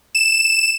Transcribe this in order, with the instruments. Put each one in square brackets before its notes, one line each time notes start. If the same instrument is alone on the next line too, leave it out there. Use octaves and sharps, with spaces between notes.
[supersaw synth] E7